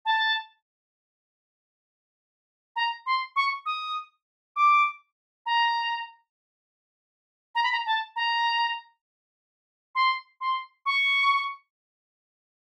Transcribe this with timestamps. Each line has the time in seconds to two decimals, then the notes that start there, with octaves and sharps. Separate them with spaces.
0.05 A5
2.76 A#5
3.06 C6
3.36 C#6
3.66 D#6
4.56 D6
5.46 A#5
7.55 A#5
7.64 B5
7.72 A#5
7.86 A5
8.16 A#5
9.95 C6
10.41 C6
10.86 C#6